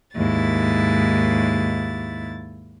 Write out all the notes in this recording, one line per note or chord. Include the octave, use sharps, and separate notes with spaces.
D#2 G#2 E4 A6